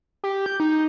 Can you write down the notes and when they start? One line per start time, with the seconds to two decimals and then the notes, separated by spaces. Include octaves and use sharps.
0.24 G4
0.46 G6
0.60 D#4